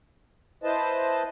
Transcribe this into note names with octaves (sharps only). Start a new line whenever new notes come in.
E4 B4 C5 D#5 A5